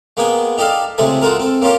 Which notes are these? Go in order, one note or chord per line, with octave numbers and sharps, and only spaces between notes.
G#3 A#3 B3 G5 G#5
D#4 G4 A4 D5 F5
C#2 C3 G#3 A3 A4 G#5
G#3 F4 F#4 A4 A#4
C4 A4
A#3 C#4 F4 G4 A#4